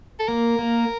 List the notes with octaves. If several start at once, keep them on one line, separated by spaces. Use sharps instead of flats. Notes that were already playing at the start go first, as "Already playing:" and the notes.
A4
A#3 A#4
A#3